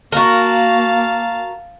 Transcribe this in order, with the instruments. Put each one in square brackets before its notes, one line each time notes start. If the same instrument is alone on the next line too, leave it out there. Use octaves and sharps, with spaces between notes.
[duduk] A#3 [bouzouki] F#4 A#4 [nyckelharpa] F5 A5